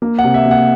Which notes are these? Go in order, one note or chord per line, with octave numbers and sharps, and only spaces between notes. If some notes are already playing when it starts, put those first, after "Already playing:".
A#3
F#5
C3
E5
A#3
F#5